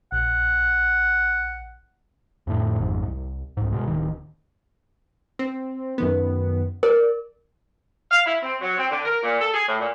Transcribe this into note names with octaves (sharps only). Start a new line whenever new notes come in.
A#1 F#5
F2 A2 D3
G#1 F2 G#2
C2
C2 G#2
B2 G#3
D1 D#3
C4
F#2 D#3 B3
A#4 D5
F5
E4
C4
F#3
C4
D3
A#4
A#2
A4
G#4
A2
A#2